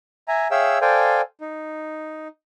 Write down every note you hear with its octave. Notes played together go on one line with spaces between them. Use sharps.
E5 G#5 A#5
G#4 C#5 E5 F5 G5 E6
A4 C5 D5 F5 G5 G#5
D#4